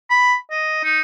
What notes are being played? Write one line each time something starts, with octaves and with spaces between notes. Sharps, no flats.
B5
D#5
D#4